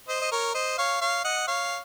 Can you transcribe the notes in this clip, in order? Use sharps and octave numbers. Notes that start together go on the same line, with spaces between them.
C5 D#5
D#5
A#4 C#5
C5 D#5
C#5 F5
C#5 F5
D#5 F#5
C#5 F5